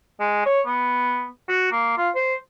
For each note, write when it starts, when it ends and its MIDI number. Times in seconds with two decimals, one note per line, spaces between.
0.20 0.43 56
0.46 0.61 73
0.67 1.27 59
1.49 1.68 66
1.72 1.94 58
1.97 2.09 65
2.15 2.35 72